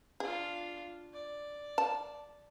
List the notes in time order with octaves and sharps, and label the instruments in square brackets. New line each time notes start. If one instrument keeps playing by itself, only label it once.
[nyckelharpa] D4 F4 [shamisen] G#4
[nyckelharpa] D5
[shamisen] A5